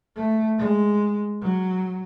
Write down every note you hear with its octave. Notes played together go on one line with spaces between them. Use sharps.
A3
G#3
F#3